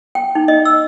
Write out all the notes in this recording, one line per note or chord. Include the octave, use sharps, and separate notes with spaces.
G5
D#4
D#5
E6